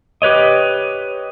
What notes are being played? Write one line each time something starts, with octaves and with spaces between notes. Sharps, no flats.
G4 B4 C#5 D#5